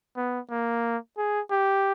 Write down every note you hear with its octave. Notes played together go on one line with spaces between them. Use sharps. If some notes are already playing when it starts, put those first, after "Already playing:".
B3
A#3
G#4
G4